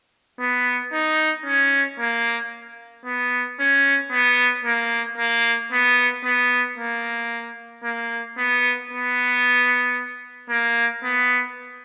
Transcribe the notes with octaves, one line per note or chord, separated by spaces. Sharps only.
B3
D#4
C#4
A#3
B3
C#4
B3
A#3
A#3
B3
B3
A#3
A#3
B3
B3
A#3
B3